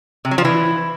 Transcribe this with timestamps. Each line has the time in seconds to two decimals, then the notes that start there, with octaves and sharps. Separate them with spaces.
0.25 C3
0.31 F#3
0.38 F3
0.45 E3